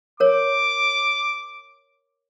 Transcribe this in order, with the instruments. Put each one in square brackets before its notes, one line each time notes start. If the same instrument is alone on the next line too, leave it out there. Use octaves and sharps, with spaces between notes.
[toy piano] A#4 C#5 [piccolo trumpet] D6